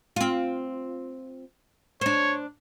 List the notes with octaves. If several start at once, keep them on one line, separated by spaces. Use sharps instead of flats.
C4 F4
D4 C5 C#5